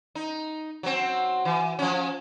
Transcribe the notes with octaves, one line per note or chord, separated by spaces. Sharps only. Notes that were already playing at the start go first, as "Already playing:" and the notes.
D#4
F#3 C4
E3
F3 C#4